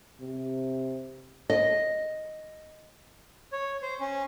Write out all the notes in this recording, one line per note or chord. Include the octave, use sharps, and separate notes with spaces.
C3
D#5
C#5
C5
C#4